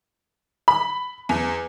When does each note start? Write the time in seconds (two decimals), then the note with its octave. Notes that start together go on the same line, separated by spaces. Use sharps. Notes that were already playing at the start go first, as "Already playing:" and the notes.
0.68 B5
1.29 E2